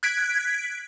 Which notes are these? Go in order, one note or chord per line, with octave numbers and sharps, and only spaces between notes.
F#6 G#6 B6 D7